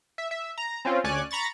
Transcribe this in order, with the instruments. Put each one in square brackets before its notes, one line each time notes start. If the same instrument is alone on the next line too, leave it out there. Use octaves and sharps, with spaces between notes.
[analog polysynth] E5
E5
A#5
C4 C#4 F4
D2 C#4 C#5 D5 G#5 F#6
A#5 B5 C#6 A6